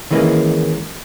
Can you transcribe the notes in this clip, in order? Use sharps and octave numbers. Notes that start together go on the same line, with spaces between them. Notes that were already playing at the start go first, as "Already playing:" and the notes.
D#3 E3 G#3 A#3 C#4